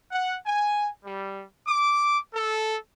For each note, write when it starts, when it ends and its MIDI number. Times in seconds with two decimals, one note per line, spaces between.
0.11 0.35 78
0.46 0.88 80
1.04 1.43 55
1.66 2.18 86
2.33 2.75 69